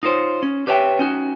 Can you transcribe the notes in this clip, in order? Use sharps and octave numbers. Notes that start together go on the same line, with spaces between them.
D#4 F4 A#4 C5 C#5
C#4
G4 B4 C#5 E5 F#5 G5
C#4 D#4 F#4